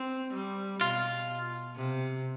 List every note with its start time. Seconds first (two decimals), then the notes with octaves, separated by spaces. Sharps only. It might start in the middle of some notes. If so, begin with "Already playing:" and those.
Already playing: C4
0.33 G3
0.81 B2 F4
1.75 C3